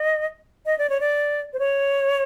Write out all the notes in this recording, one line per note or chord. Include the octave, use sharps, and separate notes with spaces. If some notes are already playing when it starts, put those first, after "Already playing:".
Already playing: D#5
D#5
D5
C#5
D5
C5
C#5